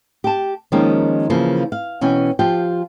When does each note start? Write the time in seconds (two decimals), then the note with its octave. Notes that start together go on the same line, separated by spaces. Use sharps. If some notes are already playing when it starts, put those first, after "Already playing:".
0.24 G4 A5
0.72 D#3 F3 G#3 A#3 C#4 F4
1.30 C#3 E3 F3 A#3
1.72 F5
2.01 B2 E3 C#4 G5 G#5
2.39 F3 F4 G4 G5